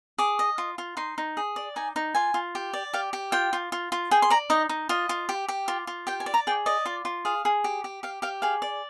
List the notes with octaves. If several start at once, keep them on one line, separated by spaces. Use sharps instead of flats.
G#4 D6
D#5
F4
F4
D#4 C6
D#4
G#4
D5
D#4 G#5
D#4
F4 G#5
F4
G4
D5
G4 F5
G4
F4 G5
F4
F4
F4
G#4 G5
C6
D5 A#5
D#4 D#5
D#4
F4 D#5
F4
G4
G4
F4
F4
G4 G5
G#5
D5
A#5
G#4 G5
D5 D#5
F4
F4
G#4 F5
G#4
G4
G4
G4 F5
G4 F5
G#4 F5
D5